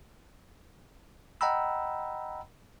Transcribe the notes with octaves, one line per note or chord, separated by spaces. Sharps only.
D#5 F#5 G5 A#5 B5 E6